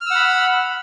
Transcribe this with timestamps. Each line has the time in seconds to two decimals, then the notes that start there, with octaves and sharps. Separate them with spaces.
0.01 F6
0.06 E6
0.11 F#5
0.15 B5